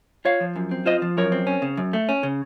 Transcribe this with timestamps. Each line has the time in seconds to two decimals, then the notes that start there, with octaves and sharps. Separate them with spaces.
0.25 F4 C#5 F5
0.40 F3
0.56 F#2
0.71 C4
0.86 F4 C5 D#5
1.02 F3
1.17 F#2 A#4 C#5
1.32 C4
1.47 C#4
1.62 C#3
1.77 F#2
1.93 A3
2.09 C#4
2.23 C#3